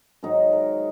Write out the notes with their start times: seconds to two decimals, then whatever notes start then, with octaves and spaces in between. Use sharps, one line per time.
0.23 G#2 D#3 F#3 D#4
0.53 A#4